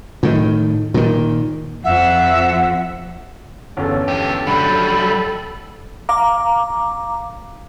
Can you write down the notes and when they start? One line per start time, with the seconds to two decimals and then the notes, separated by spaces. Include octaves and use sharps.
0.23 A2 D#3
0.94 A#2 D#3
1.84 F2 F3 E5 F#5
3.77 G1 E2 C#4 A4
4.08 E3 G4
4.47 D2 F#3 G3 B5
6.09 F5 A#5 D6